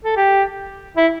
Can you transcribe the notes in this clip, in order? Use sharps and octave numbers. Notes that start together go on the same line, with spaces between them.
A4
G4
E4